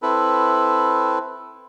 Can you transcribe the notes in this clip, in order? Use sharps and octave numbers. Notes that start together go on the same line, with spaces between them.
C4 E4 A4 B4